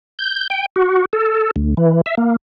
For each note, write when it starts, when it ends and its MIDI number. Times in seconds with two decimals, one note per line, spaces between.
0.19 0.47 91
0.50 0.66 79
0.76 1.05 66
1.13 1.51 69
1.56 1.74 38
1.77 2.01 52
2.06 2.15 76
2.17 2.36 58